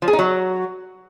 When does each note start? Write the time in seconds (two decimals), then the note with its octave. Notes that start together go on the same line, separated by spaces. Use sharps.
0.02 F3
0.08 G#4
0.13 D#4
0.19 F#3